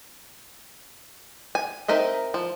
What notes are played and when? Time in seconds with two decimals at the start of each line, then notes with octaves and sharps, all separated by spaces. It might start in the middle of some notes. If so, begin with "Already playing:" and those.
1.55 G#5
1.88 C4 D#4 A#4 D#5 E5
2.34 F3